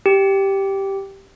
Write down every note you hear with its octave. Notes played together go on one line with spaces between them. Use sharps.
G4